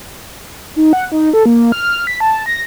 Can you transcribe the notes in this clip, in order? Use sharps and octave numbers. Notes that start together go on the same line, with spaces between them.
D#4
F#5
D#4
A4
A#3
F6
B6
A5
A#6